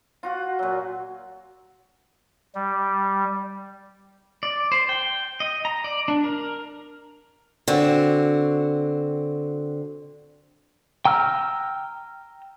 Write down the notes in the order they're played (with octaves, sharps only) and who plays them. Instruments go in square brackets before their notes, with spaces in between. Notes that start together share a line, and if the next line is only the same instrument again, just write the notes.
[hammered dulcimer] F4 F#4 F#5
A#2 F#3
[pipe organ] G3
[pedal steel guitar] D5
C5
G5
D#5
A#5
D5
D4
A#4
[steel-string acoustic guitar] D3 C4 F#4
[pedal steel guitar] G5 A#5 E6 F6